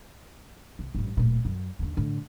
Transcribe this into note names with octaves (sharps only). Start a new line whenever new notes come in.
C2
A1 G2
D1 A#2
F#2
D#2 D3
A2 D3